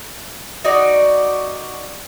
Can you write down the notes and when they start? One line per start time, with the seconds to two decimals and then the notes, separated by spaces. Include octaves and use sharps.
0.64 D#4 F#4 D5